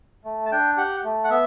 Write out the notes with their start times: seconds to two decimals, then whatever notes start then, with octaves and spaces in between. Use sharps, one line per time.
0.25 A3
0.45 A5
0.52 D4 G5
0.77 G4 F#5
1.04 A3
1.24 F#5
1.30 B3 E5